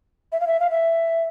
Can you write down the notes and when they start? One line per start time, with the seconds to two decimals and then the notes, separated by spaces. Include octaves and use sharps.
0.32 E5
0.40 F5
0.47 E5
0.60 F5
0.70 E5